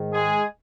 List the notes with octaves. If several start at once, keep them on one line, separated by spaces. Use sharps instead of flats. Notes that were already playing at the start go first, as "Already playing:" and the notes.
Already playing: G#2 D#3
G#3 G#4